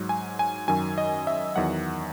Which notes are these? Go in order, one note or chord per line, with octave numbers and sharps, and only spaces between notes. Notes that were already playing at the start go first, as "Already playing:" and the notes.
Already playing: G#2 F#3
G#5
G#5
F#2 D#3 F#3 G#5
D#5
E5
E2 D#3 F#3 F#5